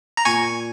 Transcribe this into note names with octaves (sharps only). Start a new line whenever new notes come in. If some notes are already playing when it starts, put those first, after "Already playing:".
A#5
A#2 G#5 C#6